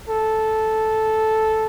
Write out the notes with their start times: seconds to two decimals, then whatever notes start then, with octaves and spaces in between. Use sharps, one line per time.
0.09 A4